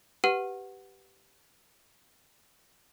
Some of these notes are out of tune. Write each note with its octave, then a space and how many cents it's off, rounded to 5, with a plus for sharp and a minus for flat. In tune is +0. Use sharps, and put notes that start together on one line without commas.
G4 -15 B4 +0 F#5 +0